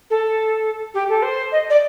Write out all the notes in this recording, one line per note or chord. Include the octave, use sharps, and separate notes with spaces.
A4
G4
A4
C5
D#5
D5